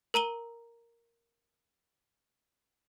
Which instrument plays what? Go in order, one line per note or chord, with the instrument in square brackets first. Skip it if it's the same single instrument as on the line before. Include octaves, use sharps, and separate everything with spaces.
[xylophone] A#4 A#5 D#7 G7